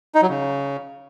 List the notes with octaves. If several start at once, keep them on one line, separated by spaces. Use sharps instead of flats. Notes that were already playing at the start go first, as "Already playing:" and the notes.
D#4
F#3
C#3